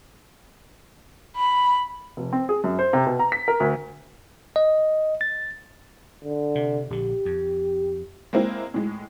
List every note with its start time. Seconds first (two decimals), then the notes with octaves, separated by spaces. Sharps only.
1.37 B5
2.17 F1
2.33 C4
2.49 G#4
2.64 F#2
2.79 C5
2.93 C3
3.07 B2
3.19 A#5
3.32 B6
3.48 A#4
3.60 D2
4.56 D#5
5.21 A6
6.24 D3
6.55 C3
6.90 A#1 D3 G4
7.25 F2
8.33 G#3 A#3 C4 E4
8.74 A2 G#3